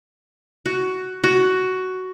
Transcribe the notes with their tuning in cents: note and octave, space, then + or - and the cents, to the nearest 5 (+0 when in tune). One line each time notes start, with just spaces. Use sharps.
F#4 +10
F#4 +10